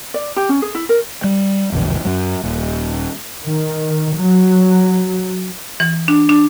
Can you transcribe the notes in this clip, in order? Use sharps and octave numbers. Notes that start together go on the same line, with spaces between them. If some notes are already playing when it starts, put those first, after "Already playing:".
D5
G4
C#4
G#4
E4
A#4
G3
E1 A#1 E2 D3
F#2 F#3
D#1
D#3
F#3
E3
D4
D4